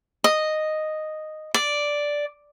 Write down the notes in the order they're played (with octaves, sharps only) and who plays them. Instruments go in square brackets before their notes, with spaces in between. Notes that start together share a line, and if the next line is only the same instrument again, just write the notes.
[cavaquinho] D#5
D5